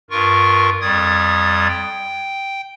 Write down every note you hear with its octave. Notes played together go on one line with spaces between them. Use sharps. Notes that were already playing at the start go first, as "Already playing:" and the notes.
G2 F4 A#4 C#6
F2 G3 D#6 G#6 A6
G5